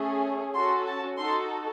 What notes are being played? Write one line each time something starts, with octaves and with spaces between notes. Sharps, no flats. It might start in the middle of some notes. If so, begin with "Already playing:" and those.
Already playing: A3 C#4 G#4
C#4 F#4 A4 C6
A5
D#4 F#4 A4 C6